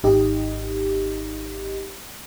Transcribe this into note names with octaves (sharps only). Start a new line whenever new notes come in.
G#1 D#4 G4 D#5